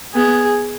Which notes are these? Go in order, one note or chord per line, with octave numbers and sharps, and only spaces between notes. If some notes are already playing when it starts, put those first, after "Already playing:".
B3 G#4